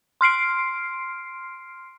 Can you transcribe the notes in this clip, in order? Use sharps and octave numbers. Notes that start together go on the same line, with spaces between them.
C6 F6 C7 D7